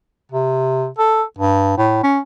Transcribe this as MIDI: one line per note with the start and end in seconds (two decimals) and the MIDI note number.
0.32 0.87 48
0.99 1.23 69
1.38 1.75 43
1.77 2.00 45
2.03 2.19 61